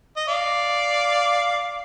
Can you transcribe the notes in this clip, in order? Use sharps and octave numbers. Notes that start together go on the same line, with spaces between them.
D#5
D5 F5